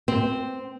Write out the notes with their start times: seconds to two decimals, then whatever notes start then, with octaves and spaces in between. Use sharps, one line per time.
0.08 C4